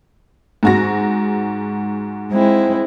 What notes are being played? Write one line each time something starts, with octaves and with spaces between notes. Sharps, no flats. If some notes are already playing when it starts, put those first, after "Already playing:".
G#2 F#4 A#6
G#3 C4 E4